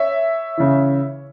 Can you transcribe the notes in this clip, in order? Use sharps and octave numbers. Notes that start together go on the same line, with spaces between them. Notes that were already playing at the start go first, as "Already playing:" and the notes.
Already playing: C#5 E5
C#3 E3